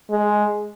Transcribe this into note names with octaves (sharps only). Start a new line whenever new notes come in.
G#3